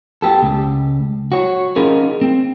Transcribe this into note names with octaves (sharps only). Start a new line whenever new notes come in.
B3 G4 A4
C#2
F#4 C#5
C#4 D#4 F4 G#4 A#4
C4